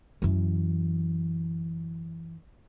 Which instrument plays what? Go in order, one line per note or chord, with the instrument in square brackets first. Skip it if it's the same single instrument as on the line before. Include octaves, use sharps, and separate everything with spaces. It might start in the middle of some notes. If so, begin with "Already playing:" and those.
[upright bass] F#2 E3